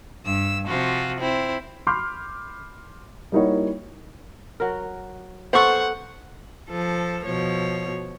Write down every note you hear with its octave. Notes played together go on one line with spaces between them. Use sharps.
G2 E6
C3 F3 F4 F#4
C4 E4
B5 C6 D6 F6 G6
G3 A#3 D#4 E4 F#4 C#5
F#3 A#4
B3 A4 C5 F#5 C#6
F3 A4
B2 F3 C#5